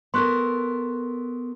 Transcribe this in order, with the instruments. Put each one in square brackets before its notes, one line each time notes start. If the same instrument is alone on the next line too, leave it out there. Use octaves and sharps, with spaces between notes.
[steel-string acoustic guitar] B3 A4 A#4 [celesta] C6 C#6 F#6